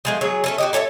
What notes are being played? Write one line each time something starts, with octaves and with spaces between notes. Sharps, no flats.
F3 G#3 A3
F#3 G#4 C#5
A3 C#4 A4
F#4 G4 D#5
A4 C#5 D5 E5